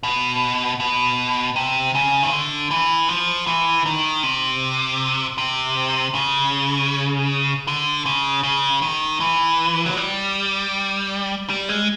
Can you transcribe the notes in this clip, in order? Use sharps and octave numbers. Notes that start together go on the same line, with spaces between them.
B2
B2
C3
C#3
D#3
D3
E3
F3
E3
D#3
C3
C3
C#3
D3
C#3
C#3
D#3
E3
F#3
G3
G3
G#3